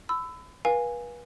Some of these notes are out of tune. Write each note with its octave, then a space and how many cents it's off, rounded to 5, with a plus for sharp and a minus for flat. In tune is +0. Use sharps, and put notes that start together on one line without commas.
B5 +30 E6 +0
B4 -35 F5 +15 G#5 -10